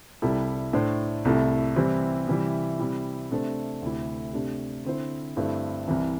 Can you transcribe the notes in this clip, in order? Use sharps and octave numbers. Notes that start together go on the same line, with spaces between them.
C2 C3 G3 E4 A4
A2 A3 D4 C5
C2 C3 A3 E4
C3 E3 G3 C4 E4
C3 E3 G3 E4
C3 G3 E4
C3 A3 D4 A4 C5
D2 C3 A3 E4 G4
C3 A3 D4 G4
D3 C4 E4 C5
G2 D3 A3 C4 E4
C2 C3 E3